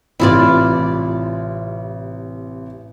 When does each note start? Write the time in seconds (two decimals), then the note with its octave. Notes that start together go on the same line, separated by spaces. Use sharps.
0.20 A1 C3 E4 F4 D5